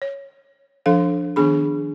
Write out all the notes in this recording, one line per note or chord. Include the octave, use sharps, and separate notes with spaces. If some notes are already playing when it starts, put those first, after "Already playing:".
C#5
F3 D4 A4 F5
D#3 B3 D4 G#4 B5